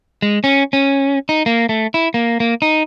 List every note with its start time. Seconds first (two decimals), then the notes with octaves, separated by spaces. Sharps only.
0.22 G#3
0.44 C#4
0.73 C#4
1.29 D#4
1.46 A#3
1.69 A3
1.94 E4
2.14 A#3
2.40 A#3
2.62 D#4